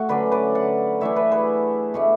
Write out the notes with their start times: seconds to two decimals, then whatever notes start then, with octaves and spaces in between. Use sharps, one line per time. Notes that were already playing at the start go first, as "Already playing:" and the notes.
Already playing: A3 F#4
0.09 D3 F#3 C#4 B4 D5
0.31 B4 D5
0.55 D5 F#5
1.01 E3 A3 D4 C#5 E5
1.16 B4 D5
1.32 G#4 B4
1.94 B2 A3 D4